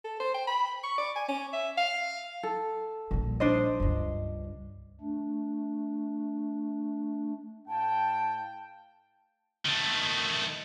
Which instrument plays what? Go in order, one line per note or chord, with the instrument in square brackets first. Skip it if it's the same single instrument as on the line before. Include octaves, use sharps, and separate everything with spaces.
[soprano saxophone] A4
C5
G5
B5
C#6
D5
G#5
C#4
E5
F5
[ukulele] A4
[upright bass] A#1 G3
[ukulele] D4 C5 D#5
[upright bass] C#2 G2
[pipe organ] A3 D4
[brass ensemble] A2 F5 G5 [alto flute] A5
[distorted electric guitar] D#3 A3